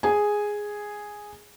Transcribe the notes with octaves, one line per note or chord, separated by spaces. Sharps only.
G#4 G#5